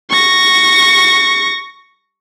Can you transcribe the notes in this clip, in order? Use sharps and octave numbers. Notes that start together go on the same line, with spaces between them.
C#6 A#6